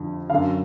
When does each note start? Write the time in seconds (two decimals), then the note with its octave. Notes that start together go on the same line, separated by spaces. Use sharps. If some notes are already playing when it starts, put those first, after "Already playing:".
Already playing: F2 D3
0.30 F#2 D3 F5